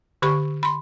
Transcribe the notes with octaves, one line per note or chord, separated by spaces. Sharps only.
D3 G4 B5 C#6
B5 C6